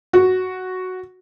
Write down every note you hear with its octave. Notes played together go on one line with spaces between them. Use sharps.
F#4